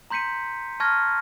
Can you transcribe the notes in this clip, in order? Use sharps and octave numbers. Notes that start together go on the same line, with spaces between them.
A#5 C6 G6 B6 C#7 D#7
A5 C#6 F6 G#6 A#6